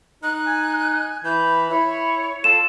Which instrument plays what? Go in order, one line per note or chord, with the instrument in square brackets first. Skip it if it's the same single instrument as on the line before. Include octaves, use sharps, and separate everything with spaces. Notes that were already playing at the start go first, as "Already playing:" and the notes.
[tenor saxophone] D#4 [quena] F#6
[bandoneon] G#5
[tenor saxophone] E3 [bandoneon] B5 [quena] G6
[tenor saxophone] E4 [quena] C#5
[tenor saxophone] F4 [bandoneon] A4 [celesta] E7